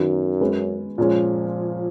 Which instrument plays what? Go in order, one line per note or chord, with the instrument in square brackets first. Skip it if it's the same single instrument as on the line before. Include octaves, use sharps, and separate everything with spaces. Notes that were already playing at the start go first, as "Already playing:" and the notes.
Already playing: [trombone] F#2 [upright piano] D#3 F#3 B3 D#4 F#4
[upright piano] G#3 C#4 G#4 B4
[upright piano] A#2 G#3 C#4 [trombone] F3